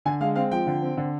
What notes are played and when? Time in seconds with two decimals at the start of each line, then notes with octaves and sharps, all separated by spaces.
0.05 D3 G#5
0.21 G#3 F5
0.36 C4 F5
0.52 F3 G5
0.67 D3
0.82 C4
0.97 D3